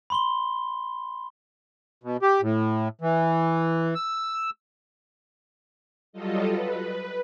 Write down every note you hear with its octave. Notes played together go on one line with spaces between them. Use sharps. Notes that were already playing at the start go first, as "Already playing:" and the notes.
B5 C6 G7
B2
G4
A2
E3
E6
F#3 G3 F4 A4 D#5
B4